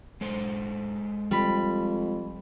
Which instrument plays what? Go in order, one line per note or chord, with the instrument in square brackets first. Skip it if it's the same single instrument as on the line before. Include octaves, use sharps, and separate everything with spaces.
[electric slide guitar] G#3 A4 C5
[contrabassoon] F2 [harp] G3 B5